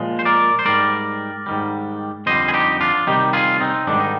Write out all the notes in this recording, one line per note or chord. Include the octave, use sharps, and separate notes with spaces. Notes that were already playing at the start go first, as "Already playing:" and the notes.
Already playing: A#2 F3 G#3
C5
A#4 D5
C5
G#2 G3 A#4 D5
G#2 D#3 G3
F2 D3 G3 C5 D#5
G#4
D#4 G4
D4 F4
C3 D#3 G3 D#4 G4
F4 G#4
C4 D#4
G#2 D#3 G3 D4
D#4